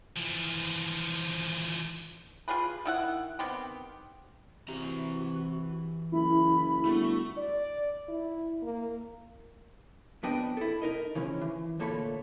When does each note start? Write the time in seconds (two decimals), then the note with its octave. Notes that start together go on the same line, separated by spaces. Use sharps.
0.17 E3 F3
2.48 F4 G4 G#4 B4
2.86 D#3 E4 F#5
3.39 D#3 B3 C4 G4
4.68 C3 E3 F#4 A#5
6.12 F#1 E4 B5
6.85 G1 A3 F#4
7.37 D5
8.08 E4
8.62 A#3
10.23 F2 B3 D4 B4 D#5 G5
10.57 E4 A4
10.82 D#4 A#4 D#5
11.15 C#3 E3 F3 C#4
11.41 E3
11.79 D2 A#2 A#3 A4 C#5 B5